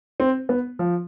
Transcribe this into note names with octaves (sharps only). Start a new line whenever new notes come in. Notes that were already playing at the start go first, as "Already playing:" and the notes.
C4
B3
F3